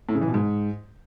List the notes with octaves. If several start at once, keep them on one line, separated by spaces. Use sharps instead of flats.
A2
C#3
E3
B2
G#2